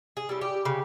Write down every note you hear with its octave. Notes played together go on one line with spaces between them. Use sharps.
G#4
G3 C#4 E4
G4
C#3